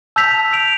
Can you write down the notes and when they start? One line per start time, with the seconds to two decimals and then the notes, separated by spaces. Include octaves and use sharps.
0.16 A5 E6 G6 B6 F7
0.51 E6 B6 D7 F7